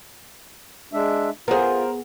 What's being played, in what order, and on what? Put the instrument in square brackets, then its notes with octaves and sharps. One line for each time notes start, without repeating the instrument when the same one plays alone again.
[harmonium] G#3 D4 E5
[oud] B3 G#4 [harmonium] F4 [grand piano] A#4 C5